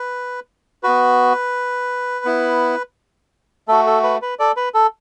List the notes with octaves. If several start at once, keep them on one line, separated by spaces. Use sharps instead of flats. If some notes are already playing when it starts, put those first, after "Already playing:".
Already playing: B4
B3 F#4 B4
B3 E4
A3 F#4 A4
A4
B4
B4
A4 D5
B4
A4